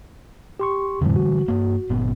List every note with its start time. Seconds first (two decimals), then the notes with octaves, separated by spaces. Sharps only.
0.60 G4 C6 C#6
1.01 F2 A2 D3 E3 G3
1.16 F#4
1.48 G2 A#3
1.90 G1 A#2 B3